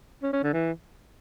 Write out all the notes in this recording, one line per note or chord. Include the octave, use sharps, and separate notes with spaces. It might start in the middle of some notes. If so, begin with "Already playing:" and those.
C#4
C#4
D3
E3